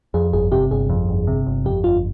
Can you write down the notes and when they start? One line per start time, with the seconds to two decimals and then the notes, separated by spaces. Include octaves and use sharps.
0.14 F2 G#4
0.33 G1 G#4
0.52 C3 G4
0.71 G1 G#4
0.90 F2
1.09 G1
1.27 C3
1.47 G1
1.65 F2 G4
1.84 G1 F4